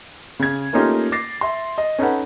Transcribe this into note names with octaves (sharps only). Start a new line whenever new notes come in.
C#3 G#6
A3 A#3 C#4 D#4 F4 G4
D6 A6 A#6 C7
E5 C6
D#5
C#4 D#4 A4 B4 F#5